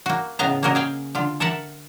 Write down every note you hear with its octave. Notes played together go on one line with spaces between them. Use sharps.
A#3 F#4
A2 C#3 B3 D#5 F5 A#5
A#3 C#4 F#4 A#4 D#5
G#4 F5 G5
D3 F4
A4 A#4 E5 F#5